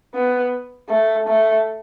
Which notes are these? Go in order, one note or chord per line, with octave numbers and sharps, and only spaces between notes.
B3
A3
A3